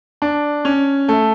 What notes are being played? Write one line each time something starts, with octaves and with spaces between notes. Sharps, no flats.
D4
C#4
A3